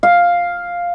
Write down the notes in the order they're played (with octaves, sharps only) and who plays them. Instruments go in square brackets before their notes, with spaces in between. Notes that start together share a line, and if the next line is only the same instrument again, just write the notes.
[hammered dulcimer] F5